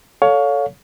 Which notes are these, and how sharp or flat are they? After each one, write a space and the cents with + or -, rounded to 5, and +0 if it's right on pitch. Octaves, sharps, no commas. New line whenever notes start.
A4 +0 C#5 +20 F5 +25